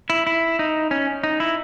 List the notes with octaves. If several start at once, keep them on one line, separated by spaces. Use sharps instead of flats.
E4
E4
D#4
C#4
D#4
E4